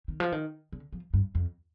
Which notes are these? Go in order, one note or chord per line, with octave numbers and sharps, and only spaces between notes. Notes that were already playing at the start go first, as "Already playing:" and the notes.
D#3
F3
D#3
D3
F3
G2
F2